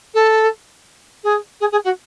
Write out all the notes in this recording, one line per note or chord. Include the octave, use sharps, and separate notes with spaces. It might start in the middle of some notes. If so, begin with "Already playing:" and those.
A4
G#4
G#4
G#4
F#4